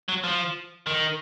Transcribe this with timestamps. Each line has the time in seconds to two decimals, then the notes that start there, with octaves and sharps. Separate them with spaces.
0.09 F#3
0.24 F3
0.87 D#3